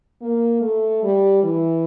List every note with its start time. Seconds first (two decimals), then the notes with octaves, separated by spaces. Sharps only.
0.22 A#3
0.61 A3
1.03 G3
1.43 E3